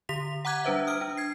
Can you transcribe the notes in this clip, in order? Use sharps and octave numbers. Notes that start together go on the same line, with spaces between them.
D3 G4 B6 F7
F#5 A#5 D6 F#6 G#6
G3 D4 B4 C5 E5
D#6 F6 D7
D4
G#6 C7